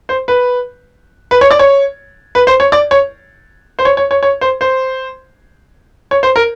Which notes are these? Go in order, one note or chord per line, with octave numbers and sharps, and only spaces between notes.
C5
B4
B4
C#5
D5
C#5
B4
C5
C#5
D5
C#5
C5
C#5
C#5
C#5
C#5
C5
C5
C#5
C5
A#4